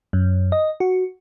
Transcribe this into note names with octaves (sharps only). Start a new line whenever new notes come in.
F#2
D#5
F#4